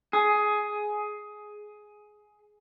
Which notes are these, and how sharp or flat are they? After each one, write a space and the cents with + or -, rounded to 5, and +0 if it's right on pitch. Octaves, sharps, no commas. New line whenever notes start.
G#4 +10